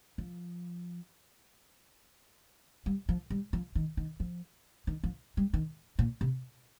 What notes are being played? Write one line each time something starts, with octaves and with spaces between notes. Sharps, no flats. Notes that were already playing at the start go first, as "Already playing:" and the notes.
F3
G3
F3
G3
F3
D#3
D#3
F3
D#3
F3
G3
D#3
A#2
C3